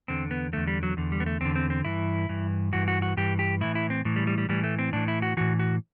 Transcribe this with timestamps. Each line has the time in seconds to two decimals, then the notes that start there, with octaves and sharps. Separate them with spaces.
0.08 E2 D3 C4
0.31 B3
0.53 E2 D3 A3
0.67 G3
0.83 F#3
0.97 E2 D3
1.12 G3
1.20 B3
1.26 A3
1.41 E2 D3 C4
1.55 C4
1.70 C4
1.85 G2 E3 E4
2.29 G2 E3
2.73 G2 E3 F#4
2.88 F#4
3.02 F#4
3.17 G2 E3 G4
3.39 G4
3.61 A2 E3 E4
3.75 E4
3.90 C4
4.05 A2 E3
4.16 G3
4.27 G3
4.38 G3
4.49 A2 E3 G3
4.64 A3
4.79 C4
4.93 A2 E3 D4
5.08 E4
5.22 F#4
5.37 A2 E3 F#4
5.59 F#4